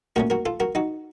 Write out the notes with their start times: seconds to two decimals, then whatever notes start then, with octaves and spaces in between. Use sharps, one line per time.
0.16 A#2 A3 C#4 F#4 A#4
0.30 F#4 A#4
0.46 F4 A4
0.60 F#4 A#4
0.75 D#4 F#4